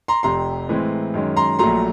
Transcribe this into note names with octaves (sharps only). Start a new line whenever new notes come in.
A#5 C6
F1 F2 C3 A#5 C6
A2 E3 G#3 C4
F#2 D#3 G#3 C#4
A#5 C6
A#1 A#2 F#3 A3 A#5 C6